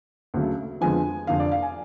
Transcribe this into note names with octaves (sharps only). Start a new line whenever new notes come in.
D2 C#3 F#3 A3
F2 D3 F3 G#3 B3 G#5
F1 F2 D3 F5
D5
F5
G#5